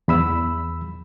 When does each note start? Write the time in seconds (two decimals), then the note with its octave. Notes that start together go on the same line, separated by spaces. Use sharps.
0.08 E2 B5 E6